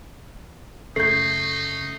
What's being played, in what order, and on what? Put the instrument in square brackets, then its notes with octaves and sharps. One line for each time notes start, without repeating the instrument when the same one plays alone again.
[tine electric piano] F#2 C#3 C#4 [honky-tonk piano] A3 G6 [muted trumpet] D#4 [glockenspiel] C7